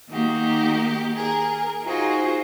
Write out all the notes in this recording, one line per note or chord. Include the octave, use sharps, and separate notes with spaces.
D#3 A#3 D#4 F#4 G4
G#4 A#4
D#4 F4 F#4 G#4 C5